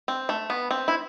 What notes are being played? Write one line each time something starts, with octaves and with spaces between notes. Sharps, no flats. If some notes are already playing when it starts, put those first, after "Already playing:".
C4
A3
B3
C4
E4